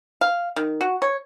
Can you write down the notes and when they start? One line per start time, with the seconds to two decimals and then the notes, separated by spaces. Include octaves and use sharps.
0.21 F5
0.56 D#3
0.81 F#4
1.02 C#5